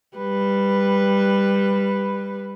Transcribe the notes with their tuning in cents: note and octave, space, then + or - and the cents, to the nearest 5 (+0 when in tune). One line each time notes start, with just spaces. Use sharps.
G3 +15 B4 +0